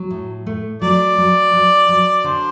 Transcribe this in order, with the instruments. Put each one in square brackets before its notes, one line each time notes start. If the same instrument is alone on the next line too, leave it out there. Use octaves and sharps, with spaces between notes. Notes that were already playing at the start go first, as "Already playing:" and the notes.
Already playing: [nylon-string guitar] F#3
A2
A3
[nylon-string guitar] F#3 [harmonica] D5
[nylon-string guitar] F#3
F#3
F#3
[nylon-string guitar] D3 [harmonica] C5